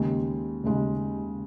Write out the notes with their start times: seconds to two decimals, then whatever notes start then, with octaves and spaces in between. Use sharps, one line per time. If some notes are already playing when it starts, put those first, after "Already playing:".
Already playing: D#2 C#3 G#3
0.64 D#2 C#3 G#3